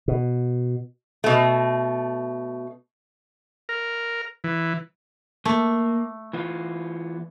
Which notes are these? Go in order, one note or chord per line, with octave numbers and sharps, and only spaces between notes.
B2
B2 A3
A#4
E3
A3 A#3
E3 B3 F4